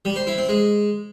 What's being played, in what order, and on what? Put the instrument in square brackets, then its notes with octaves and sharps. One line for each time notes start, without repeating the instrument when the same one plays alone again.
[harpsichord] G3
C5
E4
C4
G#3